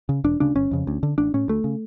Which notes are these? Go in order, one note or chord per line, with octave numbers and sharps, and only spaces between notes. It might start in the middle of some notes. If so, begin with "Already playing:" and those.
C#3
E1 D4
D2 C#3 D4
G1 C#4
F2 C#3
D2
D3
A1 D4
A2 C#4
D2 A3
C#3